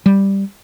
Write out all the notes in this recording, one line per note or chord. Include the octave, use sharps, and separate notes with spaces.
G3